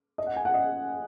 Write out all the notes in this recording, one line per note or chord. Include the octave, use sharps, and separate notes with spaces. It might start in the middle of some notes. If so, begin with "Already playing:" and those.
D#5
F#5
G#5
F#5
D#5